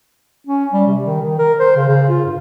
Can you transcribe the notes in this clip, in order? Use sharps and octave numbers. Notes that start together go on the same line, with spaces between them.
C#4
G3
C3
D#3
D#3
A#4
C5
C#3
C#3
F4
G2